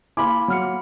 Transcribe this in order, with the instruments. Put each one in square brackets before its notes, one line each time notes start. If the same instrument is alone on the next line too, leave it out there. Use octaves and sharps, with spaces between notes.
[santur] A#3 B5 C6 [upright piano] E4 G#5 D6
[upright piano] F#3 F6 C#7